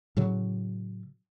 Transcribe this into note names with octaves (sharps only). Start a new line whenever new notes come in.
A2 C#3 F#3